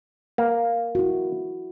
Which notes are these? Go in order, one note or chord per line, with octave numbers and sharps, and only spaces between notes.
A#3
E4 F#4